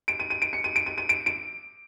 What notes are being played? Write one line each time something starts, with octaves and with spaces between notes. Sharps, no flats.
D7
D#7
D#7
D7
C#7
D#7
D7
D#7
D#7
D7
D7